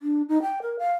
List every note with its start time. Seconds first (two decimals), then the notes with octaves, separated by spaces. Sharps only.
0.02 D4
0.29 D#4
0.42 G5
0.62 A#4
0.79 F5